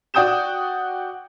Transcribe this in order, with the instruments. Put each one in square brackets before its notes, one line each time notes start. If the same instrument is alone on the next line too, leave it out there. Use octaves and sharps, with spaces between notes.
[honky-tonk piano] F#4 D5 G5 D#6 G6 E7